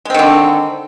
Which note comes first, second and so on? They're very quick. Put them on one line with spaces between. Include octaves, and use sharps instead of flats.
G#3 C4 D#3 D3